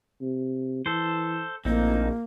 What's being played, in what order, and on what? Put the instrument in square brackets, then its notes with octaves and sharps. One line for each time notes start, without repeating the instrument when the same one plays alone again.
[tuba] C3
[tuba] E3 [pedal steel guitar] A4 C5
[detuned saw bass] A#1 [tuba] A2 [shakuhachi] A#3 [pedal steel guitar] C4 D#4